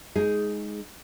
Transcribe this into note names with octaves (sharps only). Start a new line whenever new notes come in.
G#3 D#4 G#4